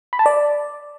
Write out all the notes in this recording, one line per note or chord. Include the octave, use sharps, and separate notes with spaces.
B5
A5
D5